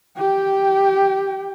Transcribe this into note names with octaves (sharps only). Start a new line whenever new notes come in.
G4 G5